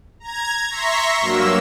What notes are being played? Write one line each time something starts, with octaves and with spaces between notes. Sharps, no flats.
A#5 G#6
E5 A#5 C6 C#6 A#6 B6
G2 F#3 A#3 E6